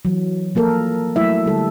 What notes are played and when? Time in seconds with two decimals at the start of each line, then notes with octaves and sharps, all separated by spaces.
0.05 E3 F#3
0.55 F3 A#3 A4 A#4
1.16 F#3 A3 E4 E5
1.46 D3 G3 A4